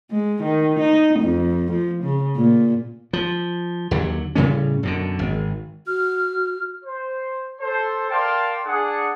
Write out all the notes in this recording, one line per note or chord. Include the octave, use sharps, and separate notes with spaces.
G#3
D#3
D#4
F2
F3
C#3
A#2
F3
D#2 D3 F#3
A2 C#3 G3 C#4
F#2 B2 D3
G#1
F#4 F6
C5
A4 C5
A#4 D5 F5 G5 A5 C6
D4 G#4 F#5